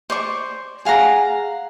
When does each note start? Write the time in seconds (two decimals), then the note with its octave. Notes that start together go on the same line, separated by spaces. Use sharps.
0.10 C5 D5 C#6
0.85 G#4 F5 F#5 A#5